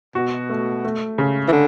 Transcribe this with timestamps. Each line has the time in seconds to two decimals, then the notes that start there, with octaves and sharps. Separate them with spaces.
0.15 B2 F#4
0.49 A3
0.84 A3
1.18 C#3
1.48 E3
1.52 D3